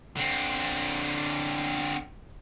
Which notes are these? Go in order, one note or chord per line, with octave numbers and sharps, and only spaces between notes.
D3 C4